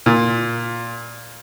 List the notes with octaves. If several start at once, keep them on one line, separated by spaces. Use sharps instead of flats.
A#2